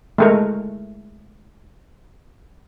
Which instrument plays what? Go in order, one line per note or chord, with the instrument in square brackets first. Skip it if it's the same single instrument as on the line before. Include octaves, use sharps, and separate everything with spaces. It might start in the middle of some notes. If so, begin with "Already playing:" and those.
[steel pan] G#3 A3 A#4